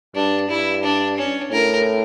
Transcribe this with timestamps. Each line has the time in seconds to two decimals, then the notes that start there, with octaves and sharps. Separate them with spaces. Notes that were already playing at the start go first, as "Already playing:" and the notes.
0.15 G2 D4
0.49 G2 E4
0.83 D4
1.18 C#4
1.52 A2 A#4